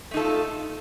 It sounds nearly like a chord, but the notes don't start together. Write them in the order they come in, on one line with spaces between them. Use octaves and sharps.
A3 D#4 A4 F4